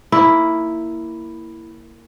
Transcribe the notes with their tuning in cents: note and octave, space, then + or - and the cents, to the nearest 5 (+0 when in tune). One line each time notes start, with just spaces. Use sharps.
A#3 -10 E4 +0